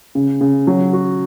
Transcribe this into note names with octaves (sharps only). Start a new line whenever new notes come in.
C#3
C#3
F#3
F#4